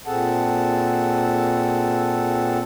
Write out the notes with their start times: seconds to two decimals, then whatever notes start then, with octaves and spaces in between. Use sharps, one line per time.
0.07 A#2 C4 G#4 A4 F#5 A5